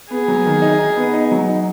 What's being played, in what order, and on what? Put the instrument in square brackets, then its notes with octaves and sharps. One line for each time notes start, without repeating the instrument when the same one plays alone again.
[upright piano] B3 [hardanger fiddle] G#4
[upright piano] F#3
D#3
D#4
D#4
B3
D#4
F#3
D#4